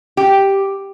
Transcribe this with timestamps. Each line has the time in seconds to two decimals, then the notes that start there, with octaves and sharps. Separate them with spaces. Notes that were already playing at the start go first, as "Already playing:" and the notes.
0.17 G4